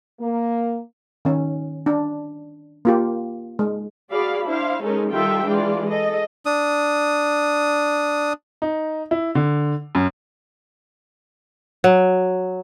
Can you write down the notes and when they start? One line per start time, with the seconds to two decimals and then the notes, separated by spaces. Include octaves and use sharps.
0.20 A#3
1.25 D#3 C#4
1.86 D4
2.85 A#3 F4 G4
3.59 G#3
4.11 F#4 G#4 D5 F5 B5
4.45 D4 E4 C5 F5
4.82 G#3 C#4 D#4 A4 A#4
5.12 D#3 G3 F4 A4 E5 G5
5.45 E3 G#3 D4 F4 D5
5.88 G#4 A4 D#5
6.46 D4 D#6
8.62 D#4
9.11 E4
9.35 D3
9.95 F#2
11.84 F#3